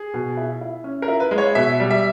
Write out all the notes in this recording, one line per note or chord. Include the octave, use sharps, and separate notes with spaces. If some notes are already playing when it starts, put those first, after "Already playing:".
Already playing: G#4
B2
E4
E4
C#4
A#4
E4
B4
G#3
C#5
B2 E5
G3
E5